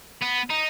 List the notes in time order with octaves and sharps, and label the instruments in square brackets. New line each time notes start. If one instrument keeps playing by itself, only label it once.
[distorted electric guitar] B3
D#4